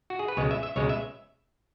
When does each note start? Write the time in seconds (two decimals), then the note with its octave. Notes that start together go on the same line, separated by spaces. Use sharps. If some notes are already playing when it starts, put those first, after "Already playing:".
0.10 F#4
0.19 G#4
0.28 B4
0.37 C#2 B2 G#3 C#5
0.51 E5
0.63 E5
0.76 C#2 B2 G#3 C#5
0.89 E5